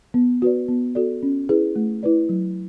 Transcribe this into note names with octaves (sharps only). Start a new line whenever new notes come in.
B3
F#4 B4 D5
B3
F#4 A4 D5
C#4
E4 G#4 B4
A3
E4 B4 D5
F#3